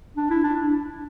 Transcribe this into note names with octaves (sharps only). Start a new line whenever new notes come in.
D4
E4
D4